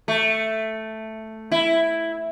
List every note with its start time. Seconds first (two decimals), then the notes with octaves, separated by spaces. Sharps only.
0.08 A3
1.52 E4